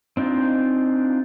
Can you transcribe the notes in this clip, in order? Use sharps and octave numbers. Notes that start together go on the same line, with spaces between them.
C4 D4 D#4 F4